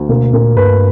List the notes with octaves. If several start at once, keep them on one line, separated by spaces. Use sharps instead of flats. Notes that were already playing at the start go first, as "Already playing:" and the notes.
Already playing: D2
B2 A#3
A#2 A#3
G2 B4